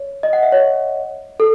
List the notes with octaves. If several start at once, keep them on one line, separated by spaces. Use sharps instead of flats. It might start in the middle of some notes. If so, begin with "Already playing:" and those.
Already playing: C#5
D#5
F#5
E5
C#5
A4